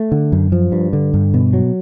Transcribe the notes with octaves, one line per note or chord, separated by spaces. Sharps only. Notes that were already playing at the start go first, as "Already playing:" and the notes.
Already playing: A3
D3
F#2
F3
G2
D3
G2
B2
F#3